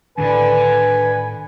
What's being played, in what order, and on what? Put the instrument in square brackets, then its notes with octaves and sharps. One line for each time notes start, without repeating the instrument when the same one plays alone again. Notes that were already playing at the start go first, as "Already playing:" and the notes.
[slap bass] A2 D#3 [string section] D3 [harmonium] B4 [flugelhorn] G#5